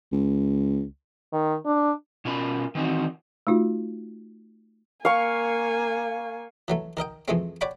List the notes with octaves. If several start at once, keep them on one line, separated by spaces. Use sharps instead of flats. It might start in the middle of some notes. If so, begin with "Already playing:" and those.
C#2
D#3
D4
B2 C#4 F4 A#4 B5
D#3 E3 C4 D#4 F#4
A3 D#4 F4 F#4
A#3 F5 G#5 C#6
E3 F#3 A3
D#3 A#4 D#5 G5
F2 E3 G#3 A3 C4
C#5 D5 F#5 G5 B5